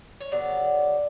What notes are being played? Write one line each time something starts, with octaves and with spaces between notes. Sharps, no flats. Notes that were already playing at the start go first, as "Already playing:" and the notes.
C#5
C#3 F#3 B3 D5